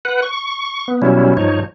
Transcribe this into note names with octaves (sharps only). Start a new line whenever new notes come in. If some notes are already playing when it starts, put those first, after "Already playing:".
B4 F#5
C#6
B3
B2 F#3 G3 C#4 E4
G2 F3 D#4 C#5